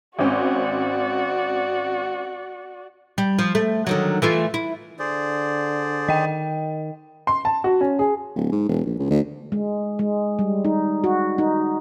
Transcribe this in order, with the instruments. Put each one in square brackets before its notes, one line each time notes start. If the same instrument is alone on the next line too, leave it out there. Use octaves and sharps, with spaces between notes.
[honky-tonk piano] G#1 C4 C#4 [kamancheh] F#4 D5
[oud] G3
F3
A3
D3 D#3 F#3
E3 A3 F4
E4
[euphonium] D3 [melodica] G#4 C5 D5
[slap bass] D#3 [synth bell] D#5 G5
[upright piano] C6
A5
F#4
C#4
G#4
[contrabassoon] D1
G#2
E1
A#1
C#2
D2
[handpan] G#3
G#3
G3
D#4
F#4
D#4